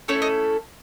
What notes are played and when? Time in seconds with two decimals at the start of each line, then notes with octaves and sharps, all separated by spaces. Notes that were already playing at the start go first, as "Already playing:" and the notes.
0.08 A3 C#4 E4 A4 C#5
0.22 D#5